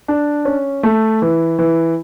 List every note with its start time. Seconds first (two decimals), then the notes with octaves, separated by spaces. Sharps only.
0.08 D4
0.45 C#4
0.83 A3
1.22 E3
1.59 E3